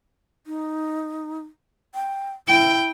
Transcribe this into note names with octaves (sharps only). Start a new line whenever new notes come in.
D#4
G5
E4 G5